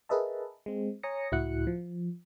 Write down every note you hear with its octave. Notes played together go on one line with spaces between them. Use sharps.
G#4 A#4 B4 D#5 E5 A5
G#3 C4
C#5 G#5 A#5 D#6 A#6 C#7
C#2 A2 E4 F#4 F#6 C#7
F3